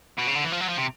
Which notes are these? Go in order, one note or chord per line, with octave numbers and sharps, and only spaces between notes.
B2
C#3
D3
E3
F3
F#3
F3
C3